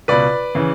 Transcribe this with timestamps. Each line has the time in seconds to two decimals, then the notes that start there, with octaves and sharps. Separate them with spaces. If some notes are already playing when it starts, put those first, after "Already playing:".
0.08 C#2 B2 B4 D5
0.55 C#3 E3